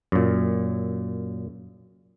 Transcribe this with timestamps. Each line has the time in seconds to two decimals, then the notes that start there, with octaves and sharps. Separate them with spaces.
0.12 F#2 A#2